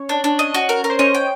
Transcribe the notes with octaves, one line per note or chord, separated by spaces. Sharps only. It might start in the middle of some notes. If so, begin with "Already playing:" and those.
Already playing: C#4 C#5
D4
D4
D#5
F#4
A#4
A#4
C5
C#4 C#5 D#5
G5